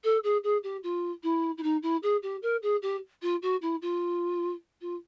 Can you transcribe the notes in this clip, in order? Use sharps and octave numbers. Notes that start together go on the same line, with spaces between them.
A4
G#4
G#4
G4
F4
E4
E4
D#4
E4
G#4
G4
A#4
G#4
G4
F4
F#4
E4
F4
F4